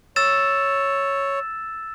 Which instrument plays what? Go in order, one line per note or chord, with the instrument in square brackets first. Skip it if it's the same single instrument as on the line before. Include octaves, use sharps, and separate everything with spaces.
[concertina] C#5 [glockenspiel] E6 A6 E7